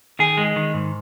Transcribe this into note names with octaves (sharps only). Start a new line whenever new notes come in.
D#3 G#4
G#3
D#3
G#2